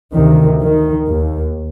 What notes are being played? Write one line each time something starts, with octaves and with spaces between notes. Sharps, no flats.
D2 C3 D#3
D#3
D#2